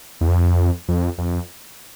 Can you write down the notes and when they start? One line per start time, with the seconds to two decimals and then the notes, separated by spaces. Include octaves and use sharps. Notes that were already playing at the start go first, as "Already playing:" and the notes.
0.21 E2
0.28 F2
0.88 F2
1.18 F2